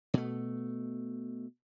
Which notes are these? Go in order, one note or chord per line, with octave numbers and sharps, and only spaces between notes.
B2 A3